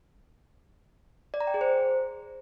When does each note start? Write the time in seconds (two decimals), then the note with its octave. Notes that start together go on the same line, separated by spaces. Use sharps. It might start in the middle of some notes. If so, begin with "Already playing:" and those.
1.34 D5
1.41 A#5
1.47 G5
1.54 G#4
1.61 C5